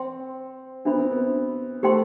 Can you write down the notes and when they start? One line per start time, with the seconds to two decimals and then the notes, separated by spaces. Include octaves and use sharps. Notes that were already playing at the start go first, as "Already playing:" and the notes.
Already playing: C4 C5 G5 C6
0.85 B3 D4 F#4 C5 E5 B5
0.98 C4
1.11 B3
1.83 A3 G4 C5 G5 C6